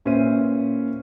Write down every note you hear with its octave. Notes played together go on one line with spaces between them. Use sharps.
A#2 C#4 B4 C5 E5 D#7